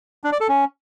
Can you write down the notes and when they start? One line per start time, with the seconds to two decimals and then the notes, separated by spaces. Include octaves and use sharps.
0.24 D4
0.32 D5
0.40 A4
0.49 C#4